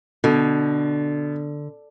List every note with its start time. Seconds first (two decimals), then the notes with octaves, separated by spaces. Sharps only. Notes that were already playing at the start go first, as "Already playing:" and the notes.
0.24 B2 D3